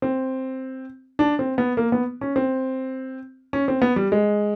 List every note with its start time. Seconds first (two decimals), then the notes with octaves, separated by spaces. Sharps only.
0.02 C4
1.19 D4
1.39 C4
1.58 B3
1.77 A#3
1.92 B3
2.21 C#4
2.36 C4
3.53 C#4
3.68 C4
3.82 B3
3.96 G3
4.12 G#3